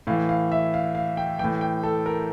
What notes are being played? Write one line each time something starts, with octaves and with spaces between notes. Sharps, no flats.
A2 E3 F5
F5
E5
F5
F5
G5
A2 E3 G5
G5
A4
A#4